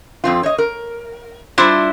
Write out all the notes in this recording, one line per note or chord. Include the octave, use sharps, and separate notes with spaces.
F2 C4 F4
C#5 D#5
A#4
G3 D4 E4 F4 C5